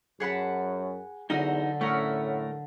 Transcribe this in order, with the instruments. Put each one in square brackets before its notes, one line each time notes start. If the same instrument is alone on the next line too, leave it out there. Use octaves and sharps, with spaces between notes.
[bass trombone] F#2 [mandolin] G#4 F#5 B5 [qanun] C#5 A5
[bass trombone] E2 [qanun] D3 F#3 [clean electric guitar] D#4 F#4 D#5
[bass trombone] A2 [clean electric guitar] A3 A#4 [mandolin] C#4 E5 F#5